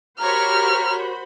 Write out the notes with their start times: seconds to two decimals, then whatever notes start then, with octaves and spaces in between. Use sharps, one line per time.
0.19 F#4 G4 A#4 C5 C#5 A#5 B5 F6